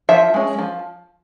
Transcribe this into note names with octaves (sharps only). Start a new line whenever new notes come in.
F3 E5
G#3 C#4
F3